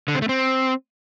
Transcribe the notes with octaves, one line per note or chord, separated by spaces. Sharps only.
D3
C4
A3
C4